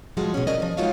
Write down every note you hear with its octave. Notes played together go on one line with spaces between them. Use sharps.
F3 G3 G#3 F#4
B2 C#4
C#4 A#4 D5 D#5
F3 G#4
G#3 D#4 F4 F#4 C#5 F5